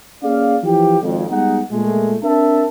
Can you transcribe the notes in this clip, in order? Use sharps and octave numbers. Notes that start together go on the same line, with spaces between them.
A#3 C#4 G#4 D5 F5
E3 F3 G4
G#1 F2
G3 G#3 B3 D#4 G#4 F#5
A#2 G#3 A3
C4 D4 A#4 E5 A5